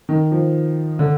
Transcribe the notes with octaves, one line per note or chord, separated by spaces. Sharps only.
D#3
F3
D3